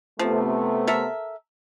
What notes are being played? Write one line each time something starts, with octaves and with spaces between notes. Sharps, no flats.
C3 F3 A3 B3
A4 A#4 E5